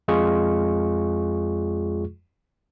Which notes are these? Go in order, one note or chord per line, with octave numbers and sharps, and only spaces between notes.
F2 G#3 F4 G#4 C#6